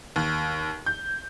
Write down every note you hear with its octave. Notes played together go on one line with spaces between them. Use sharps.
D#2
G6